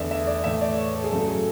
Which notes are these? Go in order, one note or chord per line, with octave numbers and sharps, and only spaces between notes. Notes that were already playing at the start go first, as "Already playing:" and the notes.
Already playing: E2 D3 A3 D5 E5
E5
D5
A2 E3 A3 E5
D5
C#5
A4
G#4
F#2 C#3 F#3 A3 A4
G#4